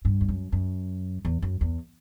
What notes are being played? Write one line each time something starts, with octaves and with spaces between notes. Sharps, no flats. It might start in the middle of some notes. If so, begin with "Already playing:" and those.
G2
E2
F#2
F#2
E2
F#2
E2